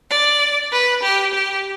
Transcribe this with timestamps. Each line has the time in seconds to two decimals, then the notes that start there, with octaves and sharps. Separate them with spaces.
0.10 D5
0.72 B4
1.03 G4
1.34 G4